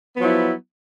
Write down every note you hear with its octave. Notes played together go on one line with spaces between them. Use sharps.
F3 F#3 B3 E4